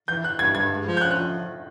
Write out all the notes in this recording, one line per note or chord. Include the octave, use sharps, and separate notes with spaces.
E3 G6
E3 F#6
G2 G#6
G2 G#6
G#3
F3
G6
C#4 F#6
F#6
F3